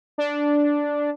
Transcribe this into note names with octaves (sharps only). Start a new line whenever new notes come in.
D4